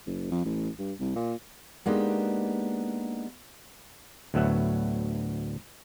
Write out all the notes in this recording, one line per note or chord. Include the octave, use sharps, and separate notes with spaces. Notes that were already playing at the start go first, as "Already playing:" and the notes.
F#1
F2
A1
G2
C2
A#2
G#3 A#3 B3 D4 D#4 G4
D2 A2 F#3 B3 E5 F#5